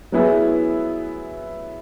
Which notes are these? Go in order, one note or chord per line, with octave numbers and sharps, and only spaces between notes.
F#3 B3 E4 G#4 B4